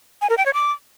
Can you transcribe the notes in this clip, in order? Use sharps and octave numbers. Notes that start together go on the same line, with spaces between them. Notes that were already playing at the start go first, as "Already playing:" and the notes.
G#5
A#4
G5
C#5
D6